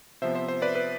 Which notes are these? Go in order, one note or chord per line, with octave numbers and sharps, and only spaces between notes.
C3 F3 B3 C5 E5
C5
C5
B4 D5
B4